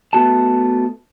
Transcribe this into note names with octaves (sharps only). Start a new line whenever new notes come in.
A3 B3 F#4 A5